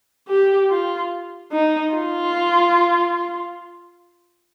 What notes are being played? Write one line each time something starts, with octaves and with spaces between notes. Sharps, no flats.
G4
F4
D#4
F4